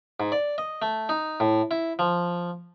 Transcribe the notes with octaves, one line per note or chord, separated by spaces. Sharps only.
G#2
D5
D#5
A3
D#4
A2
E4
F3